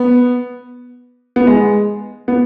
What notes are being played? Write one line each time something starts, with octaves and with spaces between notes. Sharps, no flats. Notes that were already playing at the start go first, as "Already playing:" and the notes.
Already playing: B3
B3
G#3
B3